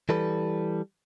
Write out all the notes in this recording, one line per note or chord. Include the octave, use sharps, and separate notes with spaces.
E3 G3 A4 B4